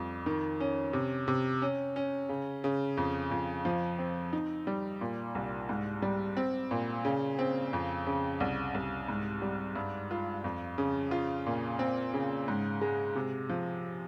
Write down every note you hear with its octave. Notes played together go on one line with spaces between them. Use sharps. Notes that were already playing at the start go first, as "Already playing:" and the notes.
Already playing: F2 G3
D#3
C#4
C3
C3
C#4
C#4
C#3
C#3
F2
F2
F3
C4
D#4
G3
A#2
C2
G#2
G3
C4
A#2
C#3
C4
F2
C#3
C2
C2
G#2
G3
G2
F4
F2
C#3
F4
A#2
C4
C#3
G#2
G#3
C3
F3